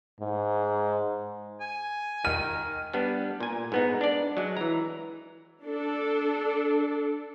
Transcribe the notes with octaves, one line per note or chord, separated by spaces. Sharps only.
G#2
G#5
D#3 F6 D#7
G3 B3 D4
A#2 G#5
G#2 B3 D#4
D4 D5
F#3 G#3
E3 A#5
D4 A4